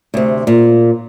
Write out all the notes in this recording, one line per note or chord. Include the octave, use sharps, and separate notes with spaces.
D2 C3
A#2